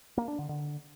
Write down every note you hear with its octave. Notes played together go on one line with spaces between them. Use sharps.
A#3
D4
D3
D3